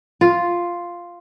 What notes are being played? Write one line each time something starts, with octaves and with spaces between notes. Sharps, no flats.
F4